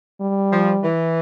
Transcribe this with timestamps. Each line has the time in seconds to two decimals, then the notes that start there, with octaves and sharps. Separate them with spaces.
0.21 G3
0.52 F3
0.83 E3